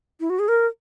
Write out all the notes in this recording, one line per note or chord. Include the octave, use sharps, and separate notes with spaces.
E4
F#4
G#4
A#4